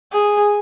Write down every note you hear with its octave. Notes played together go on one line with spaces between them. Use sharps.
G#4